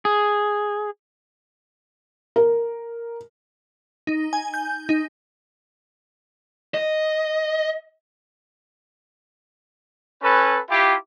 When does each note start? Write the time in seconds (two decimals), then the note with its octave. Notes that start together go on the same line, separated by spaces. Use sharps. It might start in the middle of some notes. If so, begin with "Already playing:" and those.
0.05 G#4
2.36 A#4
4.07 D#4
4.33 G#5
4.54 G6
4.89 D#4
6.74 D#5
10.22 C#4 A4 B4
10.69 E4 F4 G4